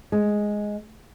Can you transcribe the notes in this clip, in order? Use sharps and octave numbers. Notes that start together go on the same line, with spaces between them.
G#3